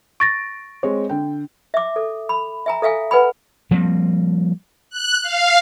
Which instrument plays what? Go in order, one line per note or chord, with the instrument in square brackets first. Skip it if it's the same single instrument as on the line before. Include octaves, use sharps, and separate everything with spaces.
[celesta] C#6 A6 A#6 [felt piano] D7
[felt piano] G#3 C4 C#5
D3 G5
[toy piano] E5 D6
A4
B5
E5 G#5 A#5
A4 E5 F5 G#5
B4 F#5 G#5 B5
[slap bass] F3 G3 A#3 C4
[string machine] F#6
F5